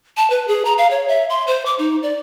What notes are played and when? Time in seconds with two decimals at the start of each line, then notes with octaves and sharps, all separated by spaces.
0.17 A5
0.30 B4
0.48 G#4
0.65 A#5
0.78 F5
0.91 C#5
1.08 E5
1.30 C6
1.47 C5
1.66 D6
1.79 D#4
2.03 D5